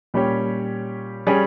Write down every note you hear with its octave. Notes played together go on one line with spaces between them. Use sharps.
A#2 G3 C#4 G4 C#5
G3 C#4 G#4